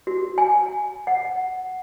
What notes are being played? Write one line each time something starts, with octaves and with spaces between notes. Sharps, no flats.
F#4
G#5
F#5